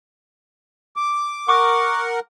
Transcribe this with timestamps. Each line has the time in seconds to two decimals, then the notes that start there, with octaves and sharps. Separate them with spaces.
0.96 D6
1.48 A#4 F#5 C#6 D6